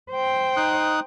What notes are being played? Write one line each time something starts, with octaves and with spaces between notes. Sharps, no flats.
C5 G5
D#4 D#6 F#6